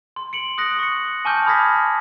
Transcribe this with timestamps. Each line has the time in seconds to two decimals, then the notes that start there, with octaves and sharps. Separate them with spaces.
0.16 C6
0.33 C#7 D7 F#7
0.58 D#6 F#6 A#6
0.79 C#6 C#7
1.25 G#5 A5 C#6 D6 F6 G6
1.46 B5 D#6 F6 G#6 A#6 B6